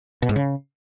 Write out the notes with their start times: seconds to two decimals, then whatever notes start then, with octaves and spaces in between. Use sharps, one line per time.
0.22 B2
0.29 G#2
0.36 C#3